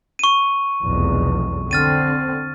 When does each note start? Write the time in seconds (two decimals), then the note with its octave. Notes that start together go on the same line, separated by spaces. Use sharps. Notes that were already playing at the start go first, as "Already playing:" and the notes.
0.19 C#6 D#7
0.83 F1 B1 E2
1.71 D3 C4 F6 A6 D#7